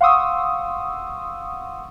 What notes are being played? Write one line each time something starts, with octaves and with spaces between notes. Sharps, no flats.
F5 F#5 C6 C#6 D#6 E6